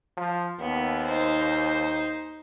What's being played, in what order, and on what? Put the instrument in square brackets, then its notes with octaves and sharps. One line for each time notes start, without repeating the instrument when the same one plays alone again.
[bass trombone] F3
[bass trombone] D#2 [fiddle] B3
[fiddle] D#4 C5